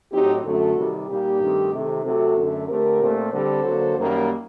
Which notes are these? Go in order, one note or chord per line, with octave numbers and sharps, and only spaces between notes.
A2 F#3 C4 D#4 G4
F#2 D3 F#3 A3 F#4 A4
C3 D#3 G3
A#2 G3 A#3 D#4 G4
G2 D#3 A3 C4
C3 D#3 A3
C3 F#3 A3 F#4 A4
F#2 D3 A3
D3 A3 C4 G4 A#4
A#2 A3 C4
D3 G3 C4 A4 C5
D3 F#3 A#3
F#2 D#3 G3 A#3